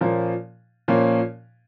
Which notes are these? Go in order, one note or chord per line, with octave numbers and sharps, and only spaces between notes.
A#2 F3 A#3 C#4
A#2 F3 A#3 C#4